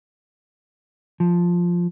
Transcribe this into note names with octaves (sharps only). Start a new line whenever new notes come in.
F3